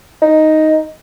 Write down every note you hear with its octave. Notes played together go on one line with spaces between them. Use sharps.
D#4